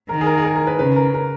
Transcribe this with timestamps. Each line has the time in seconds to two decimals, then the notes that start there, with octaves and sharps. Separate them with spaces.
0.09 D#3 A#4
0.21 G#4
0.27 A#4
0.38 G#4
0.45 A#4
0.56 A#4
0.67 B4
0.79 C#3 B4
0.96 A#4
1.14 A#4